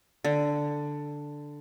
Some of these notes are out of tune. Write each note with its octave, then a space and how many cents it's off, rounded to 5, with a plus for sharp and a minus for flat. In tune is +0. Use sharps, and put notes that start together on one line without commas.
D3 +0